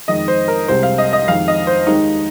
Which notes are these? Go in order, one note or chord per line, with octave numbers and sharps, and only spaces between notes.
F2 D#3 G#3 D#5
C5
A#4
C2 C3 G#3 C5
F5
D#5
D#5
F2 D#3 G#3 F5
D#5
C5
D#2 D#3 G#3 D#4